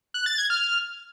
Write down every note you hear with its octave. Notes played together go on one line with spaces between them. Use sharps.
F#6
A6
G#6
F6